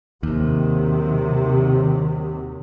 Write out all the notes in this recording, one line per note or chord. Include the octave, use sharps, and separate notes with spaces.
D#2 C3 D#3 F#3